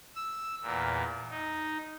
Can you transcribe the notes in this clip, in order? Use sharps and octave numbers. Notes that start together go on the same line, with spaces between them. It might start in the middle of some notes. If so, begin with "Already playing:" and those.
E6
E2 A#2
D#4